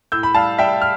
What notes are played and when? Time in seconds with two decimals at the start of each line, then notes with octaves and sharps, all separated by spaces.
0.12 A2 E6 G6
0.23 B5
0.35 G3 F5 A5
0.58 G3 E5 G5
0.81 F6